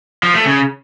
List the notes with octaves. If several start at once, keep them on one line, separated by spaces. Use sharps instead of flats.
F3
A3
C#3